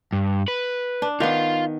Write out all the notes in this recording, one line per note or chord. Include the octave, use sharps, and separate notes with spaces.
G2
B4
D4
D#3 B3 F4 F5